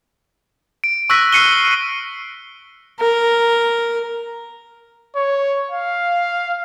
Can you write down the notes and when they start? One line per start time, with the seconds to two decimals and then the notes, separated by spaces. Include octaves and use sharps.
0.84 D7
1.10 C#6 E6 F#6 A#6 B6
1.32 E6 F6 C7 C#7 D#7 G7
3.00 A#4
5.16 C#5
5.71 F5